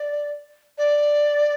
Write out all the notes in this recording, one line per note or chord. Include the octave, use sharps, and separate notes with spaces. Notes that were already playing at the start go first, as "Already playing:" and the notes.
Already playing: D5
D5